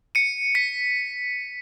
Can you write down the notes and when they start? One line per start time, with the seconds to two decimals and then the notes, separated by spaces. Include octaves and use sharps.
0.15 C#7 D#7
0.55 B6 C#7